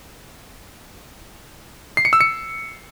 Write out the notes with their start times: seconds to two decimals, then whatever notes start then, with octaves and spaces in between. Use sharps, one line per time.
1.97 C7
2.05 C#7
2.13 E6
2.21 C#7